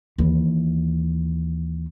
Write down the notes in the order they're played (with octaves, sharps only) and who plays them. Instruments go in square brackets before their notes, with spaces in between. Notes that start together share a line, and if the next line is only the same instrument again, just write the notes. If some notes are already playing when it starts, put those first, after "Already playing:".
[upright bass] D#2 E3